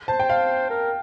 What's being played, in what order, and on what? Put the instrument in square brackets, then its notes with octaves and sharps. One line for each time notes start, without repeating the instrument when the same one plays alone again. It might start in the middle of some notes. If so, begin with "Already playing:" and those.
[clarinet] C5 [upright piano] A5
[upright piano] G5
F5
[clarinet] A#4